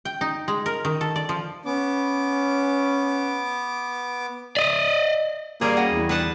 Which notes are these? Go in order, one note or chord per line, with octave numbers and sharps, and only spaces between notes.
G5
D#4
G#3
A#4
D#3
A4
D5
F3
B3 C#4 D6
D5 D#5
G3 A#3 G#4 C5 D5
C#4 F#4 D#5 F#5
E2
D3 D#3 G3 B4 F#5 A5